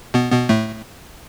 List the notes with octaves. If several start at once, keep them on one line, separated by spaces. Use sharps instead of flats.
B2 B3
B2 B3
A2 A3